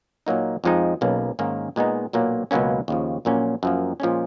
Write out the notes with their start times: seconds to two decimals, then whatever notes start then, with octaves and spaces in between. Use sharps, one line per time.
0.26 A#2 F#3 A#3 D#4
0.64 F2 F3 G#3 D#4
1.01 B1 B2 A#3 C#4
1.39 G#2 D#3 A#3 C#4
1.76 A#2 G#3 B3 D#4
2.13 B1 A#2 F#3 A#3
2.51 C#2 B2 F#3 A#3 C#4
2.88 D#2 C#3 F3
3.25 A#1 A#2 F#3 A#3 C#4
3.63 F#2 F3 A#3
4.00 A#2 F3 G#3 C#4